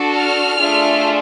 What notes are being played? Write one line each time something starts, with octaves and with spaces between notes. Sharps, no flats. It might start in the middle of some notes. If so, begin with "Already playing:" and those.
Already playing: D4 F#4 A4
F6
A3 D4 F4 G#4